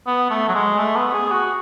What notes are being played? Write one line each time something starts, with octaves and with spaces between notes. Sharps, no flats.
B3
A3
F#3
G#3
A3
B3
G#4
F#4